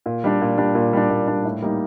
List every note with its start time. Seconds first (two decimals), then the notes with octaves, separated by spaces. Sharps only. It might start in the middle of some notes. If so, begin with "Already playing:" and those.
0.06 A#2
0.24 G3 D4
0.41 A#2
0.58 G3 D4
0.75 A#2
0.93 G3 D4
1.10 A#2
1.27 G3 D4
1.45 A2
1.62 G3 A#3 D#4